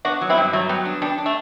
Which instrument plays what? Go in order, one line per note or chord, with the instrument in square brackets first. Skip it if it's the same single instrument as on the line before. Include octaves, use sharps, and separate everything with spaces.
[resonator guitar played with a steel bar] B3 [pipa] D4 F#4
[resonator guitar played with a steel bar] F#3
[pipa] C4 E4
[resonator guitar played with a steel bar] G2
[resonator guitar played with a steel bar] F#3 [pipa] A3
[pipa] G3 [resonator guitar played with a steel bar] B3
[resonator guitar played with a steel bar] D4
[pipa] G3 [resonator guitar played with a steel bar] D4
[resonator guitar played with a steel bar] D4
[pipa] A3